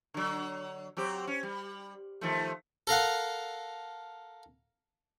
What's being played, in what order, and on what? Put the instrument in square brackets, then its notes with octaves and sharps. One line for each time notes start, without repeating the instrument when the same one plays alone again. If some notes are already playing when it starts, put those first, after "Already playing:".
[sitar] D3 F#3
F#3 C4 G4
C#4
G3
D#3 F3 A3
[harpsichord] A4 A#4 F5 F#5